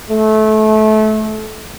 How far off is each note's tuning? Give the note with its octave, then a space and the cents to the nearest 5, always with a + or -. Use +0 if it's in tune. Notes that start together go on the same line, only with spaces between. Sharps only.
A3 -25